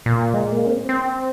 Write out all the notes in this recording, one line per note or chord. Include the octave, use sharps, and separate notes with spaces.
A#2
G#3
A#3
C#4
C4
C4